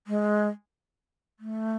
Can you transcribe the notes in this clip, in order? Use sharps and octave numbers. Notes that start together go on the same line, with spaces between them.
G#3
A3